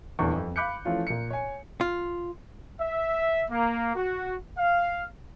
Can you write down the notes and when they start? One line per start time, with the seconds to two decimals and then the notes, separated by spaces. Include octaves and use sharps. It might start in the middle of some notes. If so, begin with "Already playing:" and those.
0.19 D#1 E2 D4 A4 C#6
0.36 F2
0.56 F5 B5 D6 F#6 G6 C#7
0.85 E3 F3 A3 C#4 F4
1.07 A#2 C#7
1.30 C#5 G#5
1.81 F4
2.81 E5
3.51 A#3
3.96 F#4
4.58 F5